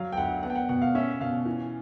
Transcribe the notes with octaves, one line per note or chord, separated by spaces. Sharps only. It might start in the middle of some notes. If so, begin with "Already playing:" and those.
Already playing: F#3 F5
G5
D2 F#5
B3 F#5
G5
F#5
B2 F#5
F5
C#4 E5
B2 F5
E3